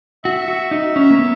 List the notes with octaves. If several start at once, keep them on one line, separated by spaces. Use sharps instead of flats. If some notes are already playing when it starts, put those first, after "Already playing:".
F#4 E5
F#4
D#4
C#4
A#3
B3